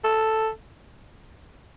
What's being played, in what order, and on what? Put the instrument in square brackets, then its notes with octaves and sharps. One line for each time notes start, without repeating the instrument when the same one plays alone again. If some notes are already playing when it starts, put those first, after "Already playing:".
[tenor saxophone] A4